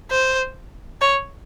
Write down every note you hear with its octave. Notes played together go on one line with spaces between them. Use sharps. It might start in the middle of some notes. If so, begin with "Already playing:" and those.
C5
C#5